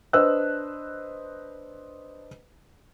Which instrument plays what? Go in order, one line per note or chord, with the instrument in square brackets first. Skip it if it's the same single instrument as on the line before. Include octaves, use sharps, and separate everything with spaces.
[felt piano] D4 B4 C5 D#5 E6 F#6